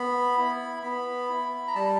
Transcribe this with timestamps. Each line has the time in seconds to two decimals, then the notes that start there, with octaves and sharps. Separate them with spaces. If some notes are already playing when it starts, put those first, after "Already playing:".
Already playing: B3 B5
0.37 E4
0.83 B3 B5
1.29 E4
1.67 A#5
1.75 G3 A5